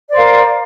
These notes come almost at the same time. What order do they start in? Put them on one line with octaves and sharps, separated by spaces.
D5 C5 F5 A#4